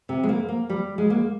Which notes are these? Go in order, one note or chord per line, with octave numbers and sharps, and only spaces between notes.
C3
G#3
A#3
A#3
G3
G#3
A#3